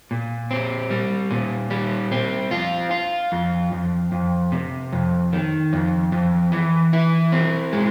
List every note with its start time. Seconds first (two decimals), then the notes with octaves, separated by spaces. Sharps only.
0.11 A#2
0.51 C4
0.91 G3
1.31 A#2
1.71 G3
2.12 C4
2.51 F4
2.91 F4
3.32 F2
3.72 F2
4.12 F2
4.52 C3
4.92 F2
5.32 D#3
5.73 F2
6.12 F2
6.52 E3
6.93 E4
7.32 C4
7.73 G#3